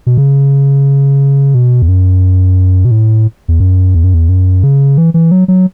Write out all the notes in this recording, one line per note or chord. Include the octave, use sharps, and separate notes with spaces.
B2
C#3
B2
E2
F#2
B2
A2
E2
F#2
E2
F#2
E2
F#2
C#3
E3
E3
F#3
F#3